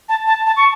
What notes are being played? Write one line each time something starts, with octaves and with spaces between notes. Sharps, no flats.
A5
A5
A5
C#6